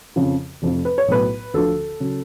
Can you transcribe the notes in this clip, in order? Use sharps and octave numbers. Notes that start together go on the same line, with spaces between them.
F2 C#3 F3
F1 F2 F3
B4
C#5
B1 A2 F#3 B4
D2 D3 F3 A4
C#3 F#3